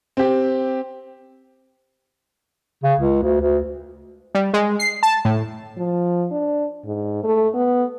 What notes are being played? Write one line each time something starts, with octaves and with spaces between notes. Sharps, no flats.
C4 G4
C#3
C#2
D2
D2
G3
G#3
C7
A5
A2
F3
D4
G#2
A3
B3